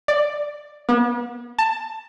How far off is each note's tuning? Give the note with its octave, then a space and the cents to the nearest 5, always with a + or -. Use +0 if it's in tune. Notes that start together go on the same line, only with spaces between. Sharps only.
D5 +10
B3 -40
A5 +15